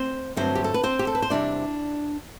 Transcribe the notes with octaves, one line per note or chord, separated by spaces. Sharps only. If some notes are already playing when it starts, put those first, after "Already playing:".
Already playing: C4 C5
G2 D3 F#3 A3 C4 C5
G4
A4
B4
C4 C5
G4
A4
B4
C5
E2 C3 G3 C4 D4 D5